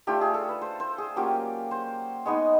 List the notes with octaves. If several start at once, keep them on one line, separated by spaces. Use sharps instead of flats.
A3 D4 F4 G4
G#4
A4
B4
C5
C5
G#4
F#3 A#3 C#4 F4 G4
C5
G#3 B3 D#4 C#5